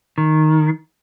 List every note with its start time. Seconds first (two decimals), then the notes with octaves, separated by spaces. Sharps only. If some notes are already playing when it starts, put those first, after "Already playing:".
0.18 D#3